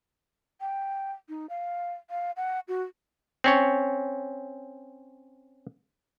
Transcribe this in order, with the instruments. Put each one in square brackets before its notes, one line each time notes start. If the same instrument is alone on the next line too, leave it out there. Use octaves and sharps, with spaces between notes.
[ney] G5
D#4
F5
F5
F#5
F#4
[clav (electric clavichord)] C4 C#4 C#5